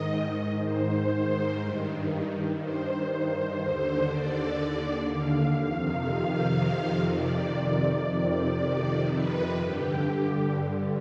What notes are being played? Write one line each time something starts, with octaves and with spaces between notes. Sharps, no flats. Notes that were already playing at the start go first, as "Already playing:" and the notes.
Already playing: G#2 D#3 D#5
C5
G2 D#3
C5
C5
D#2 D3
D5
F5
F2 C3 D#3 F5
D5
F2 C3 D#3
B4
G2 D3 G4